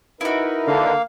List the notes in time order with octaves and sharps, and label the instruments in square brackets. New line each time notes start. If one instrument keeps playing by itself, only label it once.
[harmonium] D#4 A#4 B4 [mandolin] E4 F#4
[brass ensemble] D3 [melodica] A#3 F5